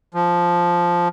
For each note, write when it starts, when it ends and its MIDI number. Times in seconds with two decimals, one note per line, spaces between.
0.14 1.08 53